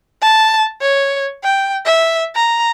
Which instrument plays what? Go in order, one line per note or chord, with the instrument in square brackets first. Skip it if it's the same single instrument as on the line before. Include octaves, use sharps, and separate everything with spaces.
[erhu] A5
C#5
G5
E5
A#5